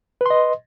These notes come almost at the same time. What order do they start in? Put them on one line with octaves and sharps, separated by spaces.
B4 C6 D#5